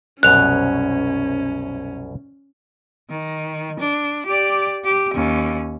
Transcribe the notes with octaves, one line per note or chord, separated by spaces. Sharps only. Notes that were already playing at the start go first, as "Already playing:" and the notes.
C2 F#2 B2 C#4 F#6 F7
D#3
D4
G4 D5
G4
D#2 C#4